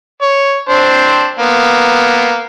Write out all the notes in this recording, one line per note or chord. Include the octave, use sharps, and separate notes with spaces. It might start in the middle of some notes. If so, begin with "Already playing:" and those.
C#5
C4 D4 C5
A#3 B3